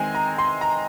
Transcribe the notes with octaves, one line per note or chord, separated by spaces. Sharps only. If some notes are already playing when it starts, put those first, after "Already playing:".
Already playing: D#3 G#3 C4 G#5
A#5
C6
A#5